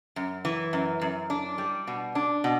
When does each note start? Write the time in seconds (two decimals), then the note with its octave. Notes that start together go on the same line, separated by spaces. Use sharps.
0.16 F#2
0.45 E3
0.73 F#2
1.01 F#2
1.30 D4
1.58 G3
1.87 B2
2.15 D4
2.44 B2